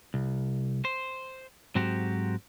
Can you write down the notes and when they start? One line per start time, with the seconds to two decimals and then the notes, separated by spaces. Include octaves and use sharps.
0.14 C2
0.85 C5
1.75 G#2 F#3 C4 F#4 G4